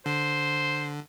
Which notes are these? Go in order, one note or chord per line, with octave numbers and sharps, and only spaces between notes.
D3 C5